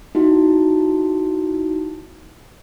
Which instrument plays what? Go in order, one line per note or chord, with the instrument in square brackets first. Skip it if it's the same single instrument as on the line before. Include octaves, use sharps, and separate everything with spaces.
[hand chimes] D#4 E4 F#4